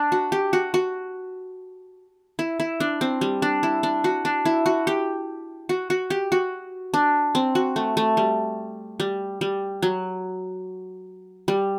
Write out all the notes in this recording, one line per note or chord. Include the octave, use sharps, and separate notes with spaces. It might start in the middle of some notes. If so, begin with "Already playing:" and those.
Already playing: D4
F#4
G4
F#4
F#4
E4
E4
D4
C4
G3
D4
E4
D4
F#4
D4
E4
F#4
G4
F#4
F#4
G4
F#4
D4
C4
F#4
A3
A3
G3
G3
G3
F#3
G3